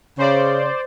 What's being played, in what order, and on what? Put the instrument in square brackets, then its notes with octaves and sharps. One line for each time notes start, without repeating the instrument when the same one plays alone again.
[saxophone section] C#3 [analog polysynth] C5 D5